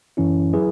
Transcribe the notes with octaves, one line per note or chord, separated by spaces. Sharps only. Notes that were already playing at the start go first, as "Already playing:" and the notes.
F#2 E3 C#4 E4
F#3 E4 G#4 B4